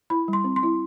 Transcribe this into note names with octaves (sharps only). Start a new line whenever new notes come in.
E4 B5
G3
C6
C4
C6
E4